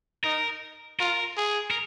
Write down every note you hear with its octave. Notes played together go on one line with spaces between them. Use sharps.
D#4 A#4
F4 A#4
G#4
A#4